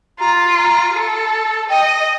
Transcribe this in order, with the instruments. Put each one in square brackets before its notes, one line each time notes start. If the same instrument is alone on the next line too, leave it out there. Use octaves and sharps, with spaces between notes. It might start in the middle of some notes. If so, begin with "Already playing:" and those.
[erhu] F4 [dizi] A#5
[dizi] A#5
[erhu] A4
[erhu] D#5 [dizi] G5